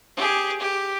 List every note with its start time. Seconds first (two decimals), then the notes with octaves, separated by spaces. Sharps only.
0.16 G4 G#4
0.60 G4